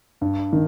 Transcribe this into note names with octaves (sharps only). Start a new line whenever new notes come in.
G2
D#3